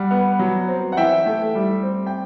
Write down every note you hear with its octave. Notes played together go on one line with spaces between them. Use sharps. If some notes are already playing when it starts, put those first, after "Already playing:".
Already playing: G3 F#5
B3
F#3
C4
F#5
E3 E5 G5
A3
G3
C4
G5